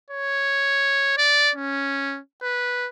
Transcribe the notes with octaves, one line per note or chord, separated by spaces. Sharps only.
C#5
D5
C#4
B4